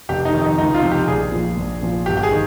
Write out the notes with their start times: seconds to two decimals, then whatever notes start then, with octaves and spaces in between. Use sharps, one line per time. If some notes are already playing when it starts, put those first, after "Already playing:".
0.09 F1 G4
0.25 D#4
0.33 F2 D#3
0.41 D#4
0.58 C#2 D#4
0.74 F4
0.82 C3 F3
0.91 G4
1.07 A#1 G#4
1.32 A#2 F3
1.57 A#1
1.82 A#2 F3
2.06 G1 G4
2.17 G4
2.23 G#4
2.32 D#3